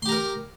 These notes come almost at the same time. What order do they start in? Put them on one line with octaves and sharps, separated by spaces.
C6 G4 A#5 A#4